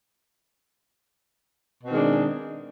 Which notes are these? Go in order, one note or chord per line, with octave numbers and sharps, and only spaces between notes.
B2 D#3 G#3 C4 D4